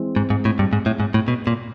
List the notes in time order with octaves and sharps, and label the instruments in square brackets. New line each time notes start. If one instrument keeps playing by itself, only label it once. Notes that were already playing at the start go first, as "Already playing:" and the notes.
Already playing: [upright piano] E3 G#3 C4
[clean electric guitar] G#2
G#2
A2
G2
G#2
A2
G#2
A2
B2
A#2